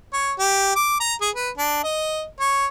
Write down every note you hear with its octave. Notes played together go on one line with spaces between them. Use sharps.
C#5
G4
D6
A#5
G#4
B4
D4
D#5
C#5